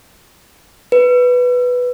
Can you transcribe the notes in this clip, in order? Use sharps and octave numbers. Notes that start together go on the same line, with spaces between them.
B4